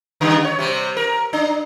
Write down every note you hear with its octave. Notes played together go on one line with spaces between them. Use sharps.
C#3 G3
C#5
C3 G3
A#4
D4